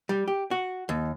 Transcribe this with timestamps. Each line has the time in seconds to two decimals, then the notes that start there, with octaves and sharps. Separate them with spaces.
0.09 G3
0.28 G4
0.51 F#4
0.89 D#2